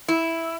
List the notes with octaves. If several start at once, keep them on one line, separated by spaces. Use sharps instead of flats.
E4